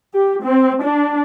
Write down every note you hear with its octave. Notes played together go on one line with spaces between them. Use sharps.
G4
C4
D4